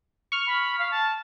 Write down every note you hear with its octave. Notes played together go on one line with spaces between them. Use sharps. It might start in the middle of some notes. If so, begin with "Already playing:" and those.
C#6 F6
B5
F5
A5